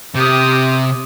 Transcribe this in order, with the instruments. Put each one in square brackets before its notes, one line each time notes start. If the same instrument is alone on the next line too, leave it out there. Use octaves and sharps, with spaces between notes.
[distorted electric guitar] C3 [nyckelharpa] G4 D#6